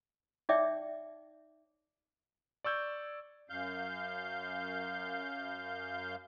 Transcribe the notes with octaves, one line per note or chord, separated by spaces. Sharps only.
D#4 C#5 D5 E5 G5 D6
D5 C#6 E6 G6 G#6
F#2 F5 G6